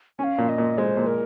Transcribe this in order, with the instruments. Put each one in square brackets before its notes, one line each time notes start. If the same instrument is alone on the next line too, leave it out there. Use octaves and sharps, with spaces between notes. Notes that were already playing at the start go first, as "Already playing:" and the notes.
[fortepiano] C#4 [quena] G#5
[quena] F5
[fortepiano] A#2
[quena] D#5
[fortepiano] A#2
[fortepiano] G#3 [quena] C5
[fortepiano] A#2
[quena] A#4